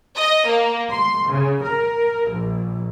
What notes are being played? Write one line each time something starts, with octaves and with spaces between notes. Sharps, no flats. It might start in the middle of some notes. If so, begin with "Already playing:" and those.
D#5
A#3
C6
C#3
A#4
A#1